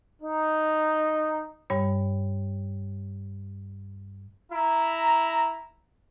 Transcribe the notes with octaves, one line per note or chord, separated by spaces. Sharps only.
D#4
G2 G3 C#5
E4 A#5